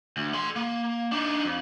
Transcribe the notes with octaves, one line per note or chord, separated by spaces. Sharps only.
D2
A4 C6
A#3
D4 D#4
F2